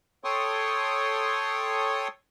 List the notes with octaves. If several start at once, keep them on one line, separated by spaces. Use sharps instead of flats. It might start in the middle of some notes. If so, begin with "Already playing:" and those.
A4 C#5 G5 C6 C#6 D#6